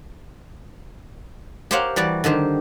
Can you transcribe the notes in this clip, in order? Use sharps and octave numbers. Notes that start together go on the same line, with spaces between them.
G4 A#4 C5 C#5 F5 F#5
E3 G3 F#4 D5
D3 D#3 G4 C5